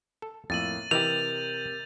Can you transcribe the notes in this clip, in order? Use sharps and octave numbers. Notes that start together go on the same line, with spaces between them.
A4
F2 A2 A#3 E6 A6 D#7 F#7
C3 E3 E4 G4 A#4 D#5 G6 F7